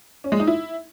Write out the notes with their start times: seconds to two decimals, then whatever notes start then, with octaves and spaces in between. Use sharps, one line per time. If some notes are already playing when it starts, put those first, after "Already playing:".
0.24 C#4
0.32 G#3
0.40 D#4
0.47 E4